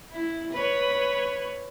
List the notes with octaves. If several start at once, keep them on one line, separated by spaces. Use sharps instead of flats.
E4
B4 C#5